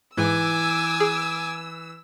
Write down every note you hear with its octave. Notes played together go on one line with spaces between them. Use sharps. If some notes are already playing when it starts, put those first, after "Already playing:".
G#2 E3 G#5 D6 E6
G#4